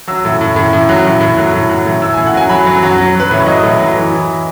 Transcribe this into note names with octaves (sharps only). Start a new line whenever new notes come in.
F#3 E6
A2
A2
A2
A2
F#3
A2
A2
F#3
A2
F#3
A2
A2 E6
A2 G#5
F#5
F#3 G#5
F#3 B5
F#3
F#3
F#3
F#3 B4
A2 C#5
F#3 D#5
A2
F#3
E3
E3